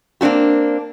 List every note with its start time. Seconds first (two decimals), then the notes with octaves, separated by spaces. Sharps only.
0.21 A#3 C4 D4 F#4 G4